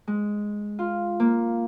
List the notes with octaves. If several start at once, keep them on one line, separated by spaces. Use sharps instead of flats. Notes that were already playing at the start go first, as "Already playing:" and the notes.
G#3
F4
A#3